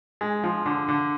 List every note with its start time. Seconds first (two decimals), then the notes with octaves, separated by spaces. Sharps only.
0.21 G#3
0.44 F3
0.66 D3
0.88 D3